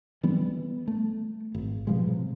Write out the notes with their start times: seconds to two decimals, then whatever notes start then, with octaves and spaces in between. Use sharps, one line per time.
0.23 E3 G3 B3
0.88 A3
1.55 G#1
1.87 B2 F3 G3 G#3
2.08 C3